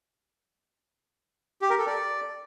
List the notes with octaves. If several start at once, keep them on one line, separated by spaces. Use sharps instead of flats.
G4
A#4
A4
D5